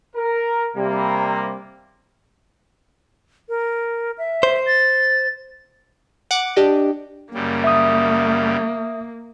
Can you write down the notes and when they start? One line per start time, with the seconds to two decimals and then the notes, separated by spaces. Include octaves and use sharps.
0.16 A#4
0.76 C3 G3 A#3
3.49 A#4
4.18 E5
4.43 C5
4.67 A6
6.31 F#5 D6
6.56 D4 G4 D#5
7.34 F#2 C#3 G3 A#3
7.64 E5 D#6